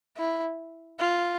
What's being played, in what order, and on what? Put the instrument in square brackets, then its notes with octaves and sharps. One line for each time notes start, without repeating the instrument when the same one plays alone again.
[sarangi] E4
F4